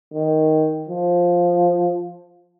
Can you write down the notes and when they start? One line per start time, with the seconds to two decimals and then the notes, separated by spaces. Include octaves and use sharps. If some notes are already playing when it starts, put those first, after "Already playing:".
0.14 D#3
0.89 F3